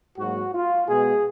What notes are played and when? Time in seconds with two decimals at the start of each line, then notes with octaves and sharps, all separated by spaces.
0.18 G#2 F#3 A#3 F#4
0.53 F4
0.88 B2 G#3 B3 G#4